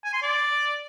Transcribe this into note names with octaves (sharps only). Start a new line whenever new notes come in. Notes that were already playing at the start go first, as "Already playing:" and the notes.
G#5
C6
D5